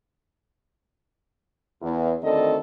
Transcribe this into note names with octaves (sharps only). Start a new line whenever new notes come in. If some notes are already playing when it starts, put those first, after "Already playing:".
E2
D2 D#3 C4 A4 D5 D#5